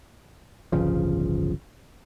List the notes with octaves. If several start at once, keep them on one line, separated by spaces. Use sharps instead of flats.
D1 G1 C#3 F3